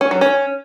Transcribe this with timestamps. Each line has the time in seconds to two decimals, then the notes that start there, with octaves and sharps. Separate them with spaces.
0.01 C#4
0.11 F#3
0.21 C#4